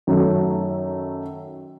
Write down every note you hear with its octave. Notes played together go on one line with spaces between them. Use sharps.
F#2 D#3 F#3 A3